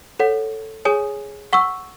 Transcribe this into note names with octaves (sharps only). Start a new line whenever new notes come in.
A4 C#5 F#5
G#4 C#5 G#5 D#6
F#5 C#6 E6